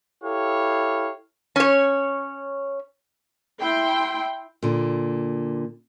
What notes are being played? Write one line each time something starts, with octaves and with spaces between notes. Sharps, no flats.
E4 G4 A4 C#5 F5
C#4 C#5
E4 G5 C6
A#2 D3